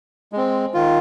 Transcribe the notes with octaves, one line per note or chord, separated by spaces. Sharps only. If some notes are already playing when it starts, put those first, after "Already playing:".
G#3 C4
D#3 F4